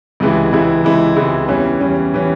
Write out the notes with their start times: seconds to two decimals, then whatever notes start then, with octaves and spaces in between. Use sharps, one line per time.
0.20 C#2 C3 E3 G#3 E4
0.52 C#2 C3 E3 G#3 E4
0.84 C#2 C3 E3 G#3 E4
1.16 C#2 C3 E3 G#3 E4
1.48 E2 E3 G3 C#4
1.81 E2 E3 G3 C#4
2.14 E3 G3 C#4